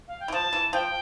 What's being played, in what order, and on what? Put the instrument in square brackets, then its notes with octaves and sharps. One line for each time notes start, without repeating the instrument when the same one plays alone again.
[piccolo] F5
G5
[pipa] E3
[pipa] F3 [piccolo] A5
[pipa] E3
[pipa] F3 [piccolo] G5